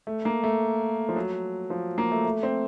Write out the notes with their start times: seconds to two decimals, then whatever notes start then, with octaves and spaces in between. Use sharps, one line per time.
0.07 A3
0.25 A#3
0.44 A3
1.09 F3
1.16 F#3
1.70 F3
1.98 A#3
2.12 A3
2.25 A3
2.43 C4